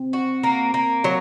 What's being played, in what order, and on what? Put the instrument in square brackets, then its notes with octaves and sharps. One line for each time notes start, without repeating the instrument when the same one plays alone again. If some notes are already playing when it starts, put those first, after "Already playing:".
Already playing: [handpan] C4
[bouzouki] F#4
A#3
A#3
F#3